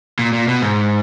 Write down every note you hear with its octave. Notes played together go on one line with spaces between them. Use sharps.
A#2
A#2
B2
G#2